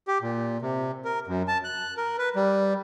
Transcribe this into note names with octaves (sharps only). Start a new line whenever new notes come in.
G4
A#2
C3
A#4
F#2
A5
F#6
A#4
B4
G3